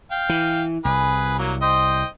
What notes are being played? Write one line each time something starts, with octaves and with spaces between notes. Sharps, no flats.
F5 G5
E3
C2 G#4 B4
F#3 A#3
C5 D#5 G5